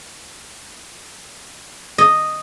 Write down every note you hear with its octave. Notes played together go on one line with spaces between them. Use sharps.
D#5